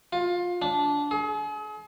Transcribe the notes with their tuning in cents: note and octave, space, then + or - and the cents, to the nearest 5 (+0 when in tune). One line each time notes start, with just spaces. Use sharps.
F4 +20
D4 -15
G#4 +40